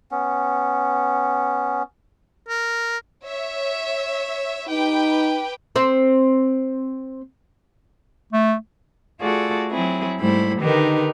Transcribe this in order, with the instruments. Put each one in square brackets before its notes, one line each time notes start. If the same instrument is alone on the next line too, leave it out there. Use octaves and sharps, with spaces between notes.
[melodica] B3 C#4
[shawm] A#4
[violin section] C#5 E5
[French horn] D#4 [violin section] G4 B4 G5
[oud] C4 C5
[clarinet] A3
[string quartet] A3 F4 F#4 G#4 A4 D5
F#3 C4 E4 G#4
G#2 G3 A3 E4 C5 B5
D3 D#3 D#4 G4 A#4 B4